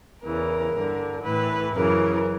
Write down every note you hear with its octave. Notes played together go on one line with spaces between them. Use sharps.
E2 C#3 E3 A#4
G2 D3
A2 E3 B4
F#2 C#3 E3 A#4